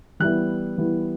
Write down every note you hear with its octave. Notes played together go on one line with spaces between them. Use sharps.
E3 G3 B3 E4 F#6
E3 G3 B3 E4